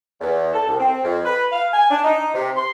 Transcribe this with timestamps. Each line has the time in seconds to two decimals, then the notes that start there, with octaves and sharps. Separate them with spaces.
0.21 E2
0.54 A4
0.67 C2
0.80 C4
1.03 F2
1.25 B4
1.52 F5
1.73 G#5
1.90 D4
2.04 D#4
2.34 C3
2.57 C6